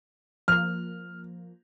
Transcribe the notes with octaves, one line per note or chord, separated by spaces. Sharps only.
F3 A#3 F6